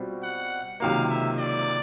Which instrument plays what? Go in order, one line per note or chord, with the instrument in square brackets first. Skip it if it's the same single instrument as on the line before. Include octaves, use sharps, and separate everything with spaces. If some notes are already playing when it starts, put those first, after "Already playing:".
Already playing: [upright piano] B2 G3 C4 F4
[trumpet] F#5
[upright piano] C#2 C3 D#3 F#3 A#3 [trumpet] F5
[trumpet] E5
D5